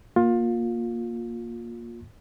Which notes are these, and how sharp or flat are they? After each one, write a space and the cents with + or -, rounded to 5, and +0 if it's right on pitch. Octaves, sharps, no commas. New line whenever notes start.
A#3 +10 F4 +20